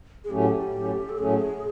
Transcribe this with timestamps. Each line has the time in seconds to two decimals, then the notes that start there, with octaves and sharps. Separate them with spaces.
0.24 G#4
0.30 A2 F#3 A3 C#4 G4
0.74 A2 F#3 A3 C#4
1.09 A4
1.18 A2 F#3 A3 C#4 G#4